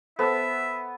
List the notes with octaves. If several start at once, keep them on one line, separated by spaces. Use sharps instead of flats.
B3 A4 C5 E5 A5 E6